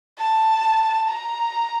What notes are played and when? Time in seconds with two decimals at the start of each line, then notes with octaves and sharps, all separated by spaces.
0.19 A5
1.09 A#5